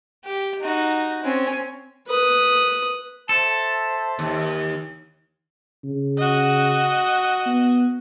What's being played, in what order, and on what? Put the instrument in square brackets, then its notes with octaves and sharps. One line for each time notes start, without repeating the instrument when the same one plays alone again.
[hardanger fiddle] G4
D#4 F#4
C4 C#4
[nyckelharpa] B4 D#6
[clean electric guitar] A4 [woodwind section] C5 E5 A5
[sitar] D#2
[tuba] C#3
[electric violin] F#4 D#5
[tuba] B3